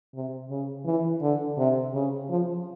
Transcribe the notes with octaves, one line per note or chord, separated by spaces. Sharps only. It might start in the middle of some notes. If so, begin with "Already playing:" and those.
C3
C#3
E3
D3
C3
C#3
F3